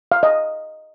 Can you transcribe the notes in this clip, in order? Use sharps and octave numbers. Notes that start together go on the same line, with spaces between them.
F5
D#5